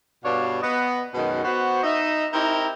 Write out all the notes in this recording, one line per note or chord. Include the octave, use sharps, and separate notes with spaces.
G2 B2 D4 C#5 D5 F5
B3 D#5
F#2 B2 D#3 G#3 C#4 B4
B3 F#4 C5
D#4 D#5 E5
C4 D#4 E4 G4 A#4 A#5